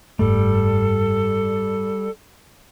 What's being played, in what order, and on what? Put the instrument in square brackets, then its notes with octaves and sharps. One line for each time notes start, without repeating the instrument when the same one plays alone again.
[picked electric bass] F#1 G#2 A3 [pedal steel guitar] G3 [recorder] A4